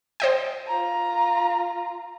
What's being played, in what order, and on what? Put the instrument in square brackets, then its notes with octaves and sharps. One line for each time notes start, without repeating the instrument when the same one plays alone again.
[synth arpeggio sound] C5 D#5 G5
[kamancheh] F4 A#5